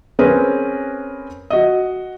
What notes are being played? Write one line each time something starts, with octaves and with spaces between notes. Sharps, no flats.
C4 C#4 G#4 A#4 B4
F#4 D#5